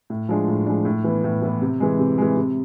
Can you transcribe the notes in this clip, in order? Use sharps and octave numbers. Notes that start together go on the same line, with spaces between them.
A2
F3 G#3 D4
A2
F3 G#3 D4
A2
E3 B3
A2
E3 B3
C3
E3 G#3
C3
E3 G#3
C3